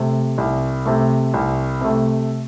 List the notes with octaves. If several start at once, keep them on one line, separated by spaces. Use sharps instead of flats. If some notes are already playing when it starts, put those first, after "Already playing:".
Already playing: C3 A3
C2
C3 A3
C2
C3 A3